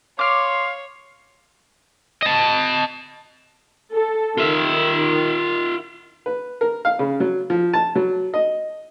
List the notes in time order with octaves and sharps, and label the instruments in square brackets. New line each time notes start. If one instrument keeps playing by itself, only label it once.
[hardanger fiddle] C#5 [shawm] F5 [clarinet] C6 [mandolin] D6 F6
[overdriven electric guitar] D#5 A5
[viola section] A4
[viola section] D#3 [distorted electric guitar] F4 E5
[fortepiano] B4
A#4
F5
C#3
F#3
F3
A5
F#3
D#5